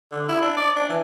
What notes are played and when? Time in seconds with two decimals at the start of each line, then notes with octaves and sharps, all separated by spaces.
0.12 D3
0.28 E4
0.42 D4
0.57 D5
0.76 D4
0.89 E3